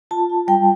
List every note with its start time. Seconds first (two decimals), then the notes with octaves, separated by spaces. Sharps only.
0.11 F4 A5
0.30 F4
0.48 G3 G5